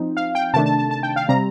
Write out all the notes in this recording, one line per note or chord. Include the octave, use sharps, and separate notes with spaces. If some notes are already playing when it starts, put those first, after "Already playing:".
Already playing: F3 C4 D#4
F5
G5
C3 D#3 A3 D4 A5
A5
A5
A5
G5
F5
C3 G3 C4 A#5